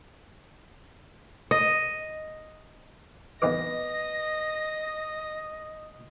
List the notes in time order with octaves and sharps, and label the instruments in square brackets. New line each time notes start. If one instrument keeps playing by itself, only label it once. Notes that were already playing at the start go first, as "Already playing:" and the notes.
[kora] D#5
[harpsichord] E2 D#4 D6 [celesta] B4 [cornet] D#5 [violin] A#6